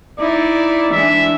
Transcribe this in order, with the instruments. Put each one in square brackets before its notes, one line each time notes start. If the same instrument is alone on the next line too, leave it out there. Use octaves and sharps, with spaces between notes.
[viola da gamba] D#4 E4 [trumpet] D5
[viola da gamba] E3 G#3 D4 [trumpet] E5